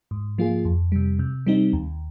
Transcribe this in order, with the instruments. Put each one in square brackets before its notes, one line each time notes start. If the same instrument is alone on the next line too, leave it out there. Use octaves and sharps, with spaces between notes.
[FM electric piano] G#2
F3 A#3 F4 G#4
F2
C3 G3
C3
G3 C4 D#4
D#2